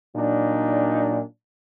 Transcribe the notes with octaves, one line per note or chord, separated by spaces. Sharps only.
A#2 F#3 D4 D#4